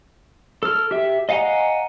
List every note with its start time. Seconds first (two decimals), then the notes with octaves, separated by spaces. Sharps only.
0.63 A4 F6
0.91 G4 E5
1.29 D#5 F5 F#5 G#5 A#5